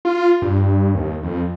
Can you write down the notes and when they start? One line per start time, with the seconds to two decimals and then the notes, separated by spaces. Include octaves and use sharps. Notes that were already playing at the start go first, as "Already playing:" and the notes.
0.05 F4
0.42 G2
0.94 D#2
1.23 F2